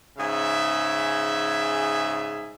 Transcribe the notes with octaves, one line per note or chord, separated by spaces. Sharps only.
G#2 C#3 G#4 E5